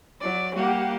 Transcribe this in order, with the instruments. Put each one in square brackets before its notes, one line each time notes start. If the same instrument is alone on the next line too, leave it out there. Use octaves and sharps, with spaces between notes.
[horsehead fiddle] F#3 D5
[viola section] G3 F#5 [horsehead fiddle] A#3 G4